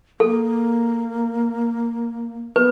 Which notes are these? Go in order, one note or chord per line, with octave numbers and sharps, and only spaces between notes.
A#3 A4
B3 B4